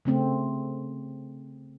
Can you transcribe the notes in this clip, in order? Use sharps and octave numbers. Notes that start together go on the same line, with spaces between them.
C#3 A3 C4